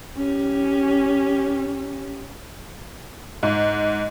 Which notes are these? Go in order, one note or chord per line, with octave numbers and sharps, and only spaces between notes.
C#4 G4
G#2